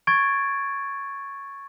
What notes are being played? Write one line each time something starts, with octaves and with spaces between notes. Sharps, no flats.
C#6 G#6 A6 D7